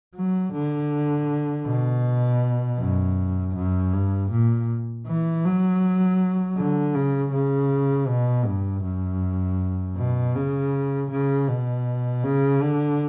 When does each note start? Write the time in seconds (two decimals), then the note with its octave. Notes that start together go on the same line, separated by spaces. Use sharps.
0.16 F#3
0.53 D3
1.67 B2
2.79 F#2
3.56 F#2
3.93 G2
4.31 A#2
5.07 E3
5.45 F#3
6.57 D3
6.96 C#3
7.32 C#3
8.08 B2
8.46 G2
8.84 F#2
9.97 B2
10.35 C#3
11.11 C#3
11.48 B2
12.24 C#3
12.62 D3